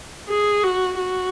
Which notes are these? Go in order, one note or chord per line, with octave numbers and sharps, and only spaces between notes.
G#4
F#4
F#4